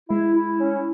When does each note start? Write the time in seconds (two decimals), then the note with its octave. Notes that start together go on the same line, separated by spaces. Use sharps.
0.09 G#3 E4
0.35 E4
0.59 C#4